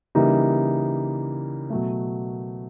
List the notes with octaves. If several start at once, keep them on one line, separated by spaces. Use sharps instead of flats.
C#3 E3 G3 A#3 D#4
B2 F#3 A3